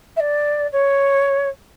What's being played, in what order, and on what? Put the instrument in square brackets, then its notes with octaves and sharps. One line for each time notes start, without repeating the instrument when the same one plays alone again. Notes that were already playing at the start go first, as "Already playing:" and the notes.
[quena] E5
D5
C#5